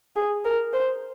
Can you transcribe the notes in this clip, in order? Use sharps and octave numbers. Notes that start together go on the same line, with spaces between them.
G#4
A#4
C5